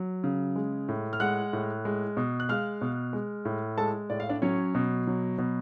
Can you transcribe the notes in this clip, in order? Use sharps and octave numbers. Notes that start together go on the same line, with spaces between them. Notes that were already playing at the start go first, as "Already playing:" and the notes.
Already playing: F#3
C#3
G#3
A2
F6
G#3 F#5 F#6
A2
G#3
B2
F#6
G#3 F5 F6
B2
G#3
A2
G#3 A4 A5
A2 D5
F5
D4 D5
F#3 C#4 C#5
B2
F#3
B2